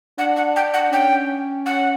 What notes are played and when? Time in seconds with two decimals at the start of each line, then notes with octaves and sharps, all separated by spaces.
0.18 D4 F#5
0.36 F#5
0.56 G5
0.74 F#5
0.92 C#4 G5
1.66 F#5